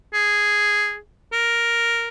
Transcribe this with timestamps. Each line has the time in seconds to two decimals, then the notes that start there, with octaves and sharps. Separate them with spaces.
0.14 G#4
1.33 A#4